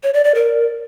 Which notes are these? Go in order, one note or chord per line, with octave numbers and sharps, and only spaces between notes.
C#5
D5
D5
A#4